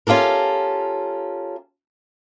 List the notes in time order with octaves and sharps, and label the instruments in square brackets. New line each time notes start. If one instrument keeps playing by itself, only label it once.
[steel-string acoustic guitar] C#4 F4 G4 A4 A#4